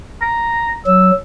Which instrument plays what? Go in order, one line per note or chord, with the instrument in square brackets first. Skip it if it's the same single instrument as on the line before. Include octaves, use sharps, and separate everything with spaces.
[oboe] A#5
[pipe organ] F#3 [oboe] E6